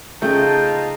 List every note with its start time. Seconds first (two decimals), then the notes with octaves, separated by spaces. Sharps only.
0.22 C#3 A3 D#4 F4 G5 A5